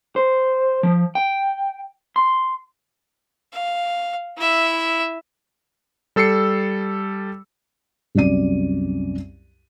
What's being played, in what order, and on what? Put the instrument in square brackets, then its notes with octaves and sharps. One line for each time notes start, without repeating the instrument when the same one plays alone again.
[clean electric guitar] C5
F3
G5
C6
[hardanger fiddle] F5
E4 E5
[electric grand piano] G3 A4 E6 C7 C#7
[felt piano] C2 F#2 D5 D#7